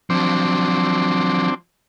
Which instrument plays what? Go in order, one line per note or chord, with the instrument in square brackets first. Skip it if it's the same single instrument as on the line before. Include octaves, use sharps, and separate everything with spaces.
[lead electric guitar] F3 F#3 [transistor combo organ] C4 D4